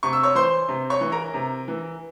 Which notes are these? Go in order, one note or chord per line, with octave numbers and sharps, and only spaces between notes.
C3 C#6
E6
C#5 C#6
E3 C5 C6
C3
C#5 C#6
E3
A#4 A#5
C3
E3